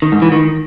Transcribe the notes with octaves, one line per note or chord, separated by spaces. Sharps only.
D#3
G#2
E3
D#3